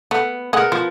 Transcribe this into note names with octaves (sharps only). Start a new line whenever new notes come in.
A3 B3
G#3 B3 A#4 D#5 F#5
F3 C5